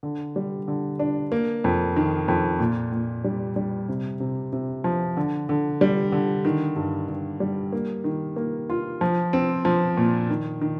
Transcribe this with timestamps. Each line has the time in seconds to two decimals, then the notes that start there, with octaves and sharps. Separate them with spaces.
0.03 D3
0.36 G3
0.68 D3
0.99 D4
1.32 A#3
1.64 F2
1.96 D#3
2.28 F2
2.60 A#2
2.92 A#2
3.24 G3
3.56 G3
3.89 C3
4.20 C3
4.53 C3
4.84 F3
5.17 D3
5.49 D3
5.81 G3
6.12 D3
6.45 D#3
6.76 G2
7.09 G2
7.40 G3
7.72 A#3
8.04 D#3
8.36 A#3
8.70 F4
9.01 F3
9.33 C4
9.65 F3
9.97 A#2
10.30 D#3
10.61 D#3